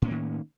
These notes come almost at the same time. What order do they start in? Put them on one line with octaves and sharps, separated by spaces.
A2 C#4 A#3 D#3